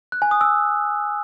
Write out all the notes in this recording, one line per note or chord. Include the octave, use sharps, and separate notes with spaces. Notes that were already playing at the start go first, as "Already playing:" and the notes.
F#6
G#5
D#6
E6